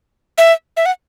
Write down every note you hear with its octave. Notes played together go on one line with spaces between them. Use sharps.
E5
E5
F#5